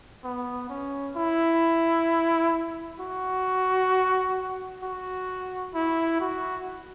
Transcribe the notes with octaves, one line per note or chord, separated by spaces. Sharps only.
B3
C#4
E4
F#4
F#4
E4
F#4